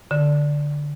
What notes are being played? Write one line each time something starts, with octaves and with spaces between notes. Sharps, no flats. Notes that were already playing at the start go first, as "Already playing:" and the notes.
D3